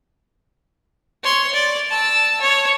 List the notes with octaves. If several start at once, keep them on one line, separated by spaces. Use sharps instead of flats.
C#5 C6
D5
A5 E6
C#5